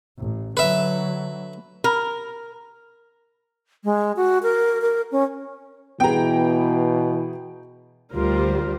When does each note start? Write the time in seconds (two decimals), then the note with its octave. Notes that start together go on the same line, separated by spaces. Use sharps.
0.17 A1
0.57 D3 F#3 B4 E5
1.84 A#4
3.84 G#3
4.16 F#4
4.43 A#4
4.82 A#4
5.12 C#4
6.00 B2 E3 B3 G#4 G5 A#5
8.13 D2 G3 F4 A#4 C5